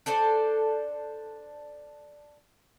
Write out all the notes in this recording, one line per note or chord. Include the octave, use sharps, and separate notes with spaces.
D4 A4 C5 D5